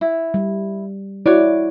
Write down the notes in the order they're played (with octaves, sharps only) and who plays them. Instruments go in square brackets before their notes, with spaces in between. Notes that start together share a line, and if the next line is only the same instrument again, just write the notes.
[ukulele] E4
[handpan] G3
[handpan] E4 [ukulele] F#4 C#5 D5